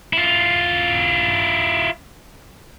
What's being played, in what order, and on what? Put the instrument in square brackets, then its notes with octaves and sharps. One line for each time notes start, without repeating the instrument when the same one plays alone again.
[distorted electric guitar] E4 F4